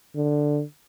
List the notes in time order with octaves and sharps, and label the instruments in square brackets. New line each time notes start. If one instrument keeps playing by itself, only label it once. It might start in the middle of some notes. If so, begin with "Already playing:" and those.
[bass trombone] D3